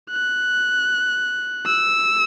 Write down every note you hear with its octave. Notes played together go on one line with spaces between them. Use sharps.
F#6
E6